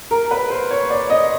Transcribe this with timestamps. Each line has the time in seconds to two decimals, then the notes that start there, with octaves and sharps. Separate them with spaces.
0.11 A#4
0.31 B4
0.50 C5
0.71 C#5
0.90 D5
1.10 D#5